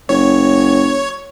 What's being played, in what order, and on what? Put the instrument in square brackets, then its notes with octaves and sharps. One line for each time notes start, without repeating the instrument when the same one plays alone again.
[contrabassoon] F#1 [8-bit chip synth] C#5